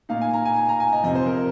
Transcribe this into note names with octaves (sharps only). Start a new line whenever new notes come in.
A#2 A#3 D#4 F5
G#5
A#5
G#5
G#5
A#5
G#5
D#5
F2 C3 F3 D#5
C5
A#4